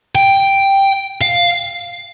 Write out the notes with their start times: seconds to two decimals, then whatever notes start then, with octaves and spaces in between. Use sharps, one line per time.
0.15 G5
1.21 F5